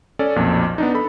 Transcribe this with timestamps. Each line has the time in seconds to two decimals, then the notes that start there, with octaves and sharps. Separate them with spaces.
0.19 C#4 A4 D5
0.36 B1 F2 A#2
0.78 B3 D4 D#4
0.94 A4 B5